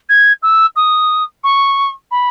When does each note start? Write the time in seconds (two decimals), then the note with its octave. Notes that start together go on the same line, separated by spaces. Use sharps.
0.09 G#6
0.42 E6
0.76 D#6
1.43 C#6
2.11 B5